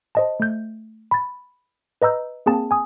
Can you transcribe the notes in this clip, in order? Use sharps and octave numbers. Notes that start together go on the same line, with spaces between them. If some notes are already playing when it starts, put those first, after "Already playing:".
C5 D#5 A5
A3 G6
B5 A6
B4 D#5 A#5 E6 G6
A#3 C4 G#4 G5 A5
G#5 D#6